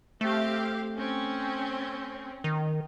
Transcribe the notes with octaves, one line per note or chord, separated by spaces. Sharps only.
A3 C4 G4 F5
C4 C#4
D#3